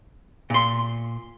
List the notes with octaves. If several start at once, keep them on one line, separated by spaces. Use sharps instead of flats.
A#2 C6